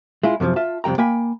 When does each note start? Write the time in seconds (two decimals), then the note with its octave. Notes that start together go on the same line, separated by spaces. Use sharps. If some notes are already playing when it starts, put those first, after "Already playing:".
0.23 G#3 E4 F4
0.40 F#2 C3 D#3 F3
0.56 F4 E5 A5
0.84 F2 C3 G3 G5 A#5
0.98 A#3 G5 G#5 B5